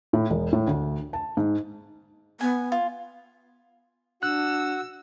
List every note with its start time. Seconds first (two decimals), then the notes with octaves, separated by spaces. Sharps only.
0.13 A2
0.30 E1
0.53 A2
0.67 D2
1.13 A5
1.37 G#2
2.41 B3 G#5
2.72 F4
4.23 D4 F#4 F#5 E6 F#6